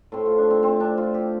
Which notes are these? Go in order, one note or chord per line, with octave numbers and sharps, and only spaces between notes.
A2 A3 C4 A4
F4
D4
C4
C4
D4
F4
G4